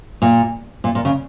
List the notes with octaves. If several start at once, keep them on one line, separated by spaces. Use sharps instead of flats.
A#2
A#2
A#2
C#3